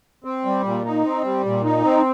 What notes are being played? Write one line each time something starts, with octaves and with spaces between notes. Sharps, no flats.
C4
G3
A#2
D#4
C4
G3
A#2
D#4
C4